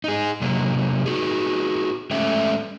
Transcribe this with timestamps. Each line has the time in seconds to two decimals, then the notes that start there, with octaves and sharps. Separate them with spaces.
0.04 D#4 G#4
0.41 C3 F#3 A#3
1.06 D#4 F#4 G#4
2.11 G#3 A3 C#4 E5 G5